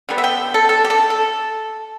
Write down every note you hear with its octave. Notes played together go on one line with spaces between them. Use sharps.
D3 G3 B3
E5
G5
A4
A4
G4
A4
A4